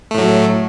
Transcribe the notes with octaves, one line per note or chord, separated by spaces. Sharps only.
A2 F#3 A3